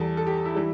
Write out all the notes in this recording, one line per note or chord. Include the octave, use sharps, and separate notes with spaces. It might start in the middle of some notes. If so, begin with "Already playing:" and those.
Already playing: E2 E3 G3 A4
A4
G4
E4
E3 G3